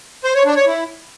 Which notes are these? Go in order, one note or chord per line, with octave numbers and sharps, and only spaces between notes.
C5
C#5
D4
C#5
E4